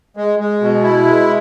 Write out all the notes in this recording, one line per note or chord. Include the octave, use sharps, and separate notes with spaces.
G#3
G#3
B2
E4
G#3